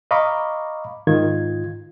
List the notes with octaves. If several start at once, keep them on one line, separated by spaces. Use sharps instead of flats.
D#5 F5 A#5 B5 C#6 D6
G#2 D#3 F4 G#6